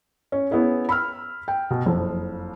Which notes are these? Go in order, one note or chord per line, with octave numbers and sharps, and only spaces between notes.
C#4
B3 C#4 E4 G#4
B5 E6 F6
G5
B2
F#1 F2